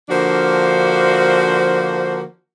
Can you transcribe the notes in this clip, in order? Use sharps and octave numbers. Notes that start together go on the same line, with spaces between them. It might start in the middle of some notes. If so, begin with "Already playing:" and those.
D3 F3 A#3 D4 F#4 C5